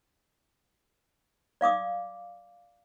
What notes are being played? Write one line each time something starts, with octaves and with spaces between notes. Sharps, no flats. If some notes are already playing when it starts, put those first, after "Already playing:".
D5 F5 D6 D#6